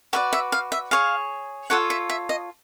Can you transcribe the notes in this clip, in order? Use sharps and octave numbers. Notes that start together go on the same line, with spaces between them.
F#4 B4 D5 E5
E5
F5
E5
G#4 C#5 F5
F4 A4 C#5 F#5
E5
E5
D#5